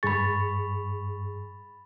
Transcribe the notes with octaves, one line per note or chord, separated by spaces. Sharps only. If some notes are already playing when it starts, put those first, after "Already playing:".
G2 G#4 B5 C#6 A6